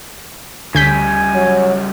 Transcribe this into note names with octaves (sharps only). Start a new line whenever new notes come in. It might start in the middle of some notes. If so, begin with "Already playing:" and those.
D2 C#3 G3 G#5 G6 B6
F#3